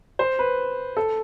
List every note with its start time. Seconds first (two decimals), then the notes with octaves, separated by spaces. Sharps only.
0.19 C5
0.39 B4
0.97 A4